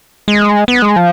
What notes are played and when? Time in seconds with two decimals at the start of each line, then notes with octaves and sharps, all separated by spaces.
0.28 G#3
0.68 B3
0.82 G#3
0.96 F3